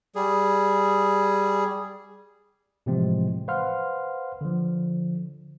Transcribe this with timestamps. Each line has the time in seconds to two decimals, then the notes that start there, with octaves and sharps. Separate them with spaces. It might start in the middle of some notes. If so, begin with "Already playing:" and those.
0.15 G3 G#4
2.86 A2 C3 E3 F3 G#3 C4
3.48 B4 C5 F5 F#5 C6 F6
4.41 D3 F3